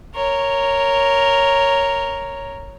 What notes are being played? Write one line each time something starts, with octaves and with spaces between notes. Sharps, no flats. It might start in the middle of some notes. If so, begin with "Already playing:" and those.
A#4 C#5